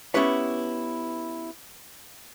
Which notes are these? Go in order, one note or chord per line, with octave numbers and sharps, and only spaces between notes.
B3 C#4 E4 G4 B4 C#5